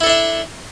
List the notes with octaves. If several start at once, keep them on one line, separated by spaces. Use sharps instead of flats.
D4 E4 A4 E5